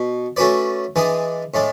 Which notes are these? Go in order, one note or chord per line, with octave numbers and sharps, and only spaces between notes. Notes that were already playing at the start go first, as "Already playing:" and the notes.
Already playing: B2
A3 C#4 F#4 B4 D5
E3 G#3 D4 G#4
A2 G#3 D4